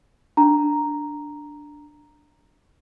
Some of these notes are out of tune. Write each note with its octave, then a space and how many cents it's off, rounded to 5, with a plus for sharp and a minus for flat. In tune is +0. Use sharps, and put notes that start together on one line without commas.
D4 +0 A#5 +0